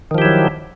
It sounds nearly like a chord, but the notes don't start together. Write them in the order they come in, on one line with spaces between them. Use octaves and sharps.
D#3 F3 G4 E4 F#3